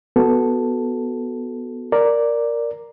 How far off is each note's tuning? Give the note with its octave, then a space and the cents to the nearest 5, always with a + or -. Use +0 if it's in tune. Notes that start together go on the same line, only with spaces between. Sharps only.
B3 +0 F#4 +0 A4 +0
A#4 +0 D5 +0